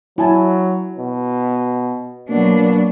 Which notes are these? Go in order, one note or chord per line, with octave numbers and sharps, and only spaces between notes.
F#3 E4 G#5 A5
B2
B2 F#3 A#3 D4